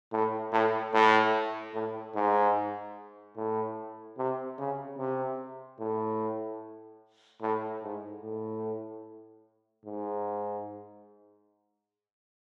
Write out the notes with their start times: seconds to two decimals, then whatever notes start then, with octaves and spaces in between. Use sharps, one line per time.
0.12 A2
0.52 A2
0.94 A2
1.73 A2
2.15 G#2
3.37 A2
4.18 C3
4.58 C#3
4.98 C3
5.79 A2
7.42 A2
7.83 G#2
8.23 A2
9.85 G#2